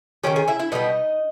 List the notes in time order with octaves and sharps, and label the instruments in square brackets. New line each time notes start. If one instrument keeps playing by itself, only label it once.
[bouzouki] D#3 G#3 C#4 G4 G5
G#4 G#5
E4 E5
E4 E5
B2 G3 B3 D#4 E4 D#5